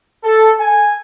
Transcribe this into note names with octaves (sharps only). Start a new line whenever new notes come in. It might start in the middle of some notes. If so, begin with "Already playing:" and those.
A4
G#5